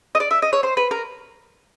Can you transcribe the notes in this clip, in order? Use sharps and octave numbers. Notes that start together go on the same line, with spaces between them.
D#5
D5
E5
D#5
C#5
C5
B4
A#4